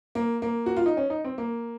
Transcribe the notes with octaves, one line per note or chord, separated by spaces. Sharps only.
A#3
A#3
F#4
F4
D#4
C#4
D#4
C4
A#3